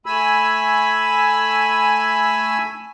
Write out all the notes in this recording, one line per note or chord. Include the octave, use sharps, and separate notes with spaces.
A3 G#5 B5 E6